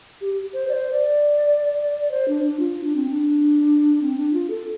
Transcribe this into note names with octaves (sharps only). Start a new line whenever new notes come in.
G4
C5
D5
C5
D5
C5
D4
D4
F4
D4
C4
D4
C4
D4
F4
A4